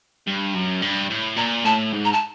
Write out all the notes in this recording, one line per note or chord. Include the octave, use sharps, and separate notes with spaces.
G2
F#2
G2
A2
A#2 A#5
A2 A5
G#2
A#5
A5